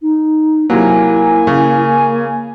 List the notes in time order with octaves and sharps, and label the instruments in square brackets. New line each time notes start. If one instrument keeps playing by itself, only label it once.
[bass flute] D#4
[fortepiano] C3 F#3 [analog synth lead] A#3 [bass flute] E4 [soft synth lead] G#5
[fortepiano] C#3